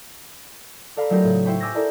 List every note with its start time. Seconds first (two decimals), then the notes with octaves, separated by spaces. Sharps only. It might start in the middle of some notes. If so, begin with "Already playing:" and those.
0.97 A4 D5 F5 A#5 B5
1.10 F#3 A3 D#4 F4 G4 A#4
1.23 A2 C#3
1.45 E4 C5 G5 B5 C#6
1.60 G#5 D6 E6 G6 G#6 A#6
1.75 D#4 E4 A4 A#4 D5 A#5